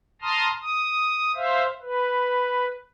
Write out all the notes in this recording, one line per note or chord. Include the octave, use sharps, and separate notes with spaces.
A5 A#5 C6 D#6 F6
D#6
C5 E5 F5
B4